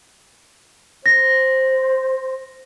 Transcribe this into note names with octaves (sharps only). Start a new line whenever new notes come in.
C5 A#6